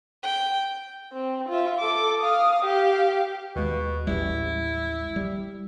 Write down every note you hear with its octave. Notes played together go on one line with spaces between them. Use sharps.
G5
C4
F4 E5
A4 D6
F5 D#6
G4 F5
D#2 B2 G#3
A1 G3 E4
G3